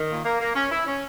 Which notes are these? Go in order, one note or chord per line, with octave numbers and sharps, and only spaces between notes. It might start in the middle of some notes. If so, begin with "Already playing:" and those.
Already playing: D#3
A#2
A#3
A#3
C#4
E4
C#4